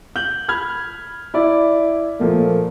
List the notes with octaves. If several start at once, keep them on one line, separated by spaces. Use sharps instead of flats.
G6 F#7
B5 F6 G#6
E4 D5
A#2 F3 A3 A#3